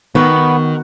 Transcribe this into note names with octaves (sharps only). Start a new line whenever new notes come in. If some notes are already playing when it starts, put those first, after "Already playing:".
D#3 B3 F#4